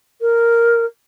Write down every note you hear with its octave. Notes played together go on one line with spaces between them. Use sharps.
A#4